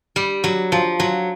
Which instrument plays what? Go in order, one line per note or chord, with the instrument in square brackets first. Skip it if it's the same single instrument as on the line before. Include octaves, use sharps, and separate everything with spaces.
[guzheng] G3
F#3
F3
F#3